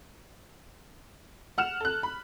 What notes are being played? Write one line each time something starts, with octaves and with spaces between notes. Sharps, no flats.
F#5 F6 E7
A4 F#6
B5